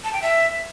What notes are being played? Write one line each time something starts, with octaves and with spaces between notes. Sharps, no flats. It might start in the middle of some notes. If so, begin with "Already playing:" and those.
A5
G5
E5